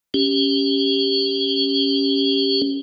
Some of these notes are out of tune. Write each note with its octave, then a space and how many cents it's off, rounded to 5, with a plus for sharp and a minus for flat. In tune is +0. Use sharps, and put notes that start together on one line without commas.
C#4 +0 G4 +0